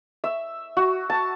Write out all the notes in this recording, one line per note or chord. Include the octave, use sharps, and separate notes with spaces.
E5
F#4
A5